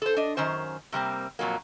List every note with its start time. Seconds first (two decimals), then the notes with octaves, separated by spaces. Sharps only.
0.02 A4 C5
0.16 D4 D#5
0.37 F#2 D#3 C#4 C5
0.92 C3 G3 A#3 C4
1.39 F2 A#2 F#3 A#3